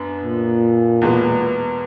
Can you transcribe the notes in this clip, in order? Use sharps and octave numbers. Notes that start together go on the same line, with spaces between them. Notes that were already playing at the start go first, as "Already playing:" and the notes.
Already playing: F#2 B3 D4
A#2
E2 B2 G#3 B3